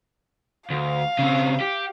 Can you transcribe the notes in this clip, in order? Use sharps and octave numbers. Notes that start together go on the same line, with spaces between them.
D2 F5
C#3 C4
G4